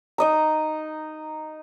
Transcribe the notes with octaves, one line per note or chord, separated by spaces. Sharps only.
D#4 D#5 A#5